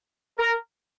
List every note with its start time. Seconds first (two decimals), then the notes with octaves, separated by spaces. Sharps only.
0.37 A#4